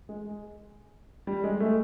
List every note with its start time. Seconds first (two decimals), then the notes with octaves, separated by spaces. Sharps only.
0.09 G#3
1.27 G3
1.44 G#3
1.60 A3